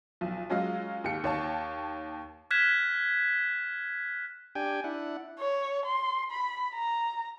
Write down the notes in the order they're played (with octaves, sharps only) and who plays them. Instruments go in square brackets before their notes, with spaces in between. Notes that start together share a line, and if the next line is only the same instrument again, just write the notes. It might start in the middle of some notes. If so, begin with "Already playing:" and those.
[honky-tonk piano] B1 F3
F#3 G#3 C#4 F4 D#5 F5
D#2 G4 C#7
D#2 C#5 A5
[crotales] F6 F#6 G#6 B6 E7
[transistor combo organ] D4 G4 G5 G#5
D4 E4 F#5
[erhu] C#5
C6
B5
A#5